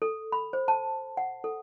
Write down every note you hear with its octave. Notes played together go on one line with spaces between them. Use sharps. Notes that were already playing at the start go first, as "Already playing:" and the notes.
A4
B5
C5
A5
F#5
A4